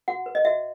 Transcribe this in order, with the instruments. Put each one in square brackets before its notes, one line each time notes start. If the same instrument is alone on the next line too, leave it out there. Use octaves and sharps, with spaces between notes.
[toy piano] F#4 F#5
B4
D#5
F#4 E5